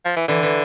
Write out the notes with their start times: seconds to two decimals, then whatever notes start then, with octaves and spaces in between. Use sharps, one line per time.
0.05 F3
0.16 E3
0.28 D3 E3
0.43 E3